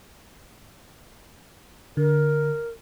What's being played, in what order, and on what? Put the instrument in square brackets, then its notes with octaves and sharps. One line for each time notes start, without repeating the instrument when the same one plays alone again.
[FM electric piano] D3 [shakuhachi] A#4